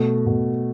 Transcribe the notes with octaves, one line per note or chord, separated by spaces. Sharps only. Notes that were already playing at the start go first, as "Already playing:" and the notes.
Already playing: B2 A3
B2